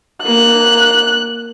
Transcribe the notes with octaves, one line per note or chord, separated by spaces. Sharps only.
A#3 F#6